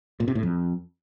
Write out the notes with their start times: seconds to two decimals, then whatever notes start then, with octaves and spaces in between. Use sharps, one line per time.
0.20 A#2
0.28 C3
0.35 A2
0.43 F2